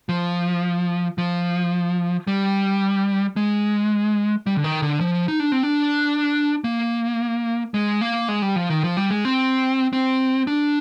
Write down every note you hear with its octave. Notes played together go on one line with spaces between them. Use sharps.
F3
F3
G3
G#3
G3
D3
D#3
D3
F3
D#4
D4
C4
D4
A#3
G#3
A#3
G#3
G3
F3
D#3
F3
G3
G#3
C4
C4
D4